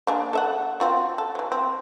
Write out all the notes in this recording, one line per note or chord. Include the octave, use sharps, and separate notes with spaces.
A#3 D4 G#4
A4 E5 F#5
C4 F4 F#4
A4
E3 F#3
C4